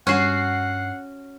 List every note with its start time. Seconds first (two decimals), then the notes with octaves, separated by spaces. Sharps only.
0.07 G2 C#4 F#4 F#5 C7